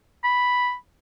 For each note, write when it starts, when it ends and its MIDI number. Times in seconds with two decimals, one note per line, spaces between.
0.24 0.74 83